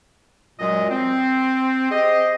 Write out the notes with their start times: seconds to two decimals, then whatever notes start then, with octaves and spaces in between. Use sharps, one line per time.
0.59 F#2 A#2 F#3 G#3 D#5
0.90 C4
1.91 G4 G#4 C5 D#5